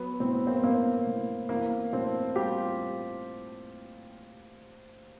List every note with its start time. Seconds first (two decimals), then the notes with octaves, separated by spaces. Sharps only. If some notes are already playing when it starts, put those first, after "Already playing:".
Already playing: F#3 B3
0.20 A2 C4
0.33 B3
0.46 A#3 C4
0.64 A2 A#3 C4
1.07 A2
1.49 E3 A#3 C4
1.93 A2 C4 D4
2.36 G3 F4 G4